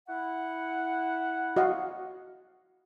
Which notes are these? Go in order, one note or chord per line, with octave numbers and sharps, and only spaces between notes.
E4 F#5
F#4 D#5 F5